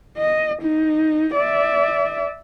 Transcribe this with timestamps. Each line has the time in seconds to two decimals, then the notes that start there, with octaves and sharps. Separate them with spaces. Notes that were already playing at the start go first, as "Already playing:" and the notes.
0.17 D#5
0.63 D#4
1.36 D5 E5